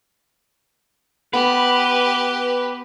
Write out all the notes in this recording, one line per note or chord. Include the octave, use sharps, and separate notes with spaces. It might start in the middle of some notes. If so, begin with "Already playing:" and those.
B3 G4 B4